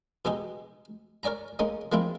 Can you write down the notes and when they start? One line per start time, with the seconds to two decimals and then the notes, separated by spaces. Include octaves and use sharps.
0.25 B2 G#3 D#4 G4 G#4
1.23 A#4 C#5 D5 G#5 A#5
1.59 G#3 A#3 C#4 D#4
1.92 F3 G#3 A#3 C4 E4 F4